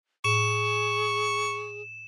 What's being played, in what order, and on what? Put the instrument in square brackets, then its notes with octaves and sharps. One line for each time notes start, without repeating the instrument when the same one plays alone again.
[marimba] A2 [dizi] G#4 [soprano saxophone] C#6 [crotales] E7